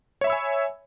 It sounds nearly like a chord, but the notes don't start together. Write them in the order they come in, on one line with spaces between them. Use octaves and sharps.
C#5 E5 B5 E6 G#5